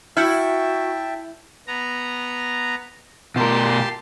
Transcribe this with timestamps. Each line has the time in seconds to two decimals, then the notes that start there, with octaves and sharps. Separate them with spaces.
0.17 E4 F#4 E5 G5 A5 F6 G6 C#7
1.67 B3 A#5
3.36 B2 G4 A#4 A5 C6